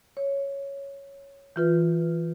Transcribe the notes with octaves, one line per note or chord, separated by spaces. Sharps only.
C#5
E3 F4 B4